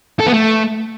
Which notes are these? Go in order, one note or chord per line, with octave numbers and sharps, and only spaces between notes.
A4
B3
A3